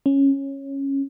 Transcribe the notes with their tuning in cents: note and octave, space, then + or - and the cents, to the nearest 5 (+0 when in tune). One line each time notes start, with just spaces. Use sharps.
C#4 -10